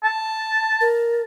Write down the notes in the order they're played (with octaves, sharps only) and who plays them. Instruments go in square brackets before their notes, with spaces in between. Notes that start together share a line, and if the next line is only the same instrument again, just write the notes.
[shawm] A5
[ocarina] A#4